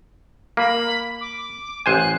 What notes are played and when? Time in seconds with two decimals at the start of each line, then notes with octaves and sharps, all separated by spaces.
0.57 A#3 B5
1.21 D6
1.86 A1 C5 G#5 F#6